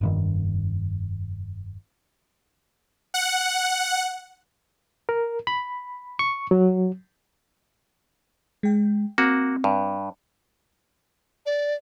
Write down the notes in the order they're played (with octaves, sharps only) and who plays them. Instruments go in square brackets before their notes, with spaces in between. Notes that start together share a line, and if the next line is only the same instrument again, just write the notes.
[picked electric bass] F1 G2 D#3
[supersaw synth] F#5
[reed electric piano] A#4
B5
C#6
F#3
[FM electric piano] G#3 G5
[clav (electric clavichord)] A#3 F#4 [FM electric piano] C4
[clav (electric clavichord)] G2
[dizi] D5